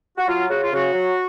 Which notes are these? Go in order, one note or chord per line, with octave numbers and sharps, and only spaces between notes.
F#4
F#3 F4
C#3 F#4
F4
C#3 F#4
F#3